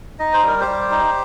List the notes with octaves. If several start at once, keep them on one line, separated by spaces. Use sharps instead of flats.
D#4 D#5
C5
G3 A#4
G4 C5
G3
D#4